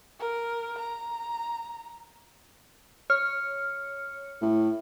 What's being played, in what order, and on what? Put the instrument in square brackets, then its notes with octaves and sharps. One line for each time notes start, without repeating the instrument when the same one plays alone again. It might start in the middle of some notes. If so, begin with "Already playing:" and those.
[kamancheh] A#4
A#5
[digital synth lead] C#5 [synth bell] F6
[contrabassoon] A2